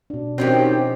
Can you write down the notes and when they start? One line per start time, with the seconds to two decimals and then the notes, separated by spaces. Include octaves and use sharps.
0.10 B2 D4
0.38 D#3 F3 F#3 C4 C#4 G4 D#5